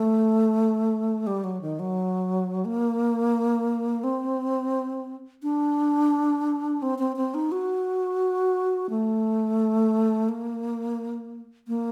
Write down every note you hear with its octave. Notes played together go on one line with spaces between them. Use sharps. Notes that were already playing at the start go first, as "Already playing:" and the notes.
Already playing: A3
G3
F#3
D#3
F#3
A#3
C4
D4
C4
C4
C4
D#4
F#4
A3
A#3
A#3